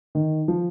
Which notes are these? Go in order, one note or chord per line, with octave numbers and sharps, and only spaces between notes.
D#3
F3